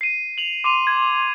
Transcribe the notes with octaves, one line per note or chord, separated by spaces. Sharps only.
C7 D#7
F7 F#7
C6 D6 D#7 F7
G#6